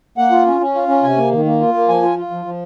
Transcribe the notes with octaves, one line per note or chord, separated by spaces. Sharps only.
A#3 F#5
F4
C#4
C#4
F4
C#4
C3 G#5
A#3
D#3
A#3
F4
A#3
F3 G#5
F4
F4
F3
F3